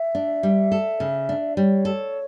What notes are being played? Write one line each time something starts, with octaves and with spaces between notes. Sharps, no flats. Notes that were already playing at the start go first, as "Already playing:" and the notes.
Already playing: E5
D4
G3
A4
C#3
D4
G3 C#5
A4